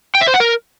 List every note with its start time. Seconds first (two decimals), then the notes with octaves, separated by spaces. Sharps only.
0.15 G5
0.21 E5
0.27 C5
0.34 F#5
0.40 A#4